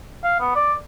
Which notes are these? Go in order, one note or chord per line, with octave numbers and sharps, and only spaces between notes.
F5
B3
D5